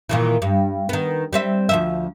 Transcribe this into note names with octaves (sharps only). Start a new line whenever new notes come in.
A#2 D#3 E3
G2
D#3 B3
G3 C4 E5
D2 F3 E5